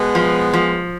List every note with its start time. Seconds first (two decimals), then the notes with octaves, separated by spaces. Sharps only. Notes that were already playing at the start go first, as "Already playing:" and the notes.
Already playing: B2 G#3 B3
0.15 F3
0.53 F3